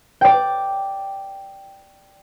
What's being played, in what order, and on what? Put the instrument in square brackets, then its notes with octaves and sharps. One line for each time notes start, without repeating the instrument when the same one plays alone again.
[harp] D5 G5